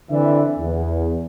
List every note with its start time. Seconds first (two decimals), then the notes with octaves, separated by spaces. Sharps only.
0.11 D3 E3 C4 D5 E5
0.58 E2